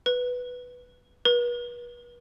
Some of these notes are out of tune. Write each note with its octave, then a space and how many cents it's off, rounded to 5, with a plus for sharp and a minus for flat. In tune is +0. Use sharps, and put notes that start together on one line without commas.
B4 +0
B4 -40